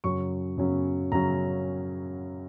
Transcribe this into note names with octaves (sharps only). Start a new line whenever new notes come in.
F#2 C#3 F#3 C#4 C#6
F#2 C#3 F#3 C#4
F#2 C#3 F#3 C#4 A#5